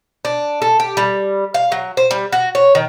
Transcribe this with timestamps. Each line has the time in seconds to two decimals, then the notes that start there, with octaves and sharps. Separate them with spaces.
0.25 D4
0.62 A4
0.80 G4
0.97 G3
1.54 F5
1.72 F#3
1.97 C5
2.11 G3
2.32 F#4
2.55 C#5
2.75 D#3